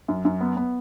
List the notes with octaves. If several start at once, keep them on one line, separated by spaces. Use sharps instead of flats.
F#2
F#2
B3
B3